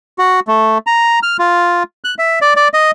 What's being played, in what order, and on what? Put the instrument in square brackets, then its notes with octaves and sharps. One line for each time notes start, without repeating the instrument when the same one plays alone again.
[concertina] F#4
A3
A#5
F6
F4
F#6
E5
D5
D5
D#5